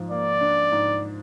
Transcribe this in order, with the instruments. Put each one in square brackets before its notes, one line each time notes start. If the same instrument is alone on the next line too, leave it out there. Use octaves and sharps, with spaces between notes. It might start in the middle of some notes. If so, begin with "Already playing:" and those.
Already playing: [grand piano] G#2 F3
[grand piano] A#3 [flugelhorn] D5
[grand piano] D4
G#2